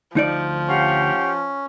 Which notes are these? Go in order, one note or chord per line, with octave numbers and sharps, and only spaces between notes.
D2 F3 D#4 D5
C#4 G4 F5 F#5